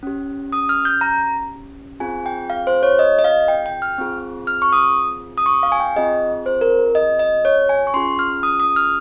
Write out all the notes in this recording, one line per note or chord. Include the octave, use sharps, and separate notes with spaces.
C#4 G4
D#6
F6
G6
A#5
C4 F4 G#4 G#5
G5
F5
C5
C#5
D#5
D#5
F5
G5
G5
F6
C4 F4 G#4
F6
C#6
D#6
D#6
C#6
F5
G#5
G5
C4 F4 G#4 D#5
C5
A#4
D#5
D#5
C#5
G#5
C#6
C#4 F4 G#4 C6
F6
D#6
D#6
F6